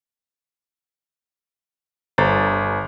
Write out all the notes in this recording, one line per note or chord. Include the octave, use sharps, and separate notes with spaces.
G1 C5 A#5 A6